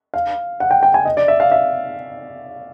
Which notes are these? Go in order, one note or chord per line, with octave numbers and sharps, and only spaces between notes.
F5
F#5
G5
G5
G#5
D#5
D5
E5
F5
E5